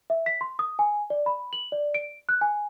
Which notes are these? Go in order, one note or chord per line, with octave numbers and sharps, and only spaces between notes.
E5
B6
C6
D#6
G#5
D5
B5
F#7
D5
D7
F#6
G#5